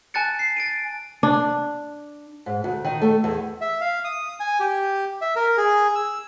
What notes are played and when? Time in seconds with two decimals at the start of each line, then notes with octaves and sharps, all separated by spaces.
0.14 G#5 A5 F#6 A6 C#7
0.39 C7
0.57 A6 D7 D#7
1.23 D4
2.46 G#2
2.64 D2
2.84 D#3
3.02 A3
3.24 E2
3.61 E5
3.81 F5
4.04 D#6
4.40 G#5
4.60 G4
5.21 E5
5.36 A#4
5.57 G#4
5.95 E6